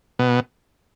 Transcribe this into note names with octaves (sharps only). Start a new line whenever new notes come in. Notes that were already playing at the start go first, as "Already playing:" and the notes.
B2